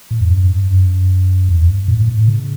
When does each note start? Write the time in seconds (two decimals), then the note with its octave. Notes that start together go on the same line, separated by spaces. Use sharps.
0.11 A2
0.21 E2
0.30 F#2
0.50 G2
0.69 F#2
1.49 E2
1.68 G2
1.88 A2
2.08 A2
2.28 C#3